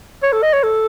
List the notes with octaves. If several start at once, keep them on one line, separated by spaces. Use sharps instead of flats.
C#5
A4
D#5
C#5
A4